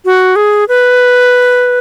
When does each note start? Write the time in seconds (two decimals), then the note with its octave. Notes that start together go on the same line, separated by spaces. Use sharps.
0.05 F#4
0.36 G#4
0.68 B4